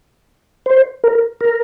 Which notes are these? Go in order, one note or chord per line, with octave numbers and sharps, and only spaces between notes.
C5
A#4
A#4